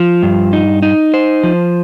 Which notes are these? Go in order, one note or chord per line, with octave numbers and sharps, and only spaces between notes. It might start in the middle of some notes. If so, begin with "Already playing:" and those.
Already playing: F3
G2
D#4
D#4
C5
F3